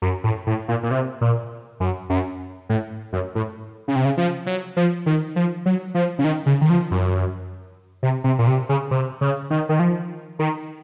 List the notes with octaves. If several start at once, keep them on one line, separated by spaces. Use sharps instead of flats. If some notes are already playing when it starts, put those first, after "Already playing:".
F#2
A2
A2
A#2
A#2
C3
A#2
F#2
F#2
A2
F#2
A2
C#3
C3
C#3
F3
F#3
F3
D#3
F3
F#3
F3
C#3
D#3
C#3
D#3
F3
F#2
C3
C3
A#2
C3
C#3
C3
C#3
D#3
D#3
F3
D#3